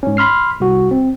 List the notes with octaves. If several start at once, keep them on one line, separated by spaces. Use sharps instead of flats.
G#2 C#4
B5 C6 F6 C7
C2 F#4
C4